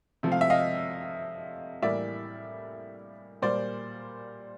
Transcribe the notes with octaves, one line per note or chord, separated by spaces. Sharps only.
C3 F3 A3
F5
E5
D#5 F5
A2 E3 G3 A#3 D5 E5
A#2 G3 A#3 C5 D5